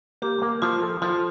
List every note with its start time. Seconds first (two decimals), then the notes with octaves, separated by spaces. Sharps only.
0.22 A#3 G4
0.42 A#3
0.62 F3 F4
0.82 A4
1.02 F3 F4